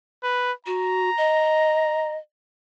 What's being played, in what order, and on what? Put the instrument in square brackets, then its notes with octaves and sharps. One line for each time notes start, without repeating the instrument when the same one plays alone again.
[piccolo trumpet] B4
[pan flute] F#4 [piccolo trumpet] A#5
[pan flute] D#5